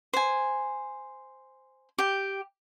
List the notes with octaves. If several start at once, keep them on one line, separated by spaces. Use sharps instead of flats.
C5 G#5
G4 G5